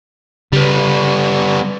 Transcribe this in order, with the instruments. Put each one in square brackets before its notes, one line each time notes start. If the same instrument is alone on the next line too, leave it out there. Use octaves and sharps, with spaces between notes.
[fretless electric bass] C#3 [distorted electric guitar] G3 B3